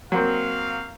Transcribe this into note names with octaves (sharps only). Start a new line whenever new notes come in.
F#3 A#3 C4 F5